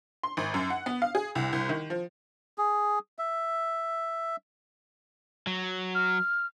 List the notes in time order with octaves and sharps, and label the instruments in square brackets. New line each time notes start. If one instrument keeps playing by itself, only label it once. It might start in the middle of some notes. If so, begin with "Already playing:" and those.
[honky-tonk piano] C6
G#1
F#2
F#5
B3
F5
G#4
C2
C2
D#3
F3
[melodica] G#4
E5
[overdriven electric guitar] F#3
[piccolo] F6